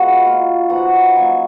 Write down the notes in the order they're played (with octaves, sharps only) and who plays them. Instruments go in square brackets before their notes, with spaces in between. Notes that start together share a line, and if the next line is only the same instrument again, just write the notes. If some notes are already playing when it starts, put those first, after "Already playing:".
Already playing: [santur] G#3 B3 F4 F#4 F#5
A#3 F4
F3 B3 D#4 F#4 F#5
F#3 A#3 C#4 G#5